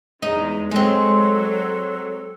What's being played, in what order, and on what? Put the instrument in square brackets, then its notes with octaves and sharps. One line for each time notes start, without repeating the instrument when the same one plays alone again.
[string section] E2 G#3 [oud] D#4
[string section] F#3 [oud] G#3 C4 [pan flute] A4